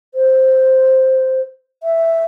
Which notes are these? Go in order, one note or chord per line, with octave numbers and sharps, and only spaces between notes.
C5
E5